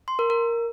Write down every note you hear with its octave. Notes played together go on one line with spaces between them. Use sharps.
C6
A#4
A#4